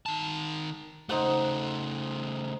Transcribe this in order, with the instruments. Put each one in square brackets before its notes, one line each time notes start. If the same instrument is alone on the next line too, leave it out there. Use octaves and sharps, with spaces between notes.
[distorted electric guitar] D#3 A5
[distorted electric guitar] C#3 A3 [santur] D#4 C5 F#5